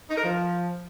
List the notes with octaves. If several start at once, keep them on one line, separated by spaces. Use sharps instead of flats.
D#4
A#4
F3